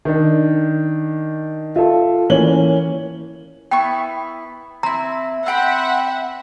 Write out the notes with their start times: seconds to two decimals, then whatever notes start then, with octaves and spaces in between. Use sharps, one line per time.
0.05 D#3 D4
1.76 F4 A4 E5
2.30 E3 A#3 C#4 F#7 G7
3.71 B3 E4 G5 C#6
4.83 C4 E4 A#5
5.46 C4 E5 F#5 G5 B5